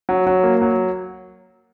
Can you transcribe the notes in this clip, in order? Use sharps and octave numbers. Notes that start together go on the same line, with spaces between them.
F#3
F#3
A#3
F#3